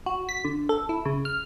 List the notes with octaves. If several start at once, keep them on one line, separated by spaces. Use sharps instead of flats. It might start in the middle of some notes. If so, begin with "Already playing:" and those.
F#4
B6
D3
A4
E4
C#3
F6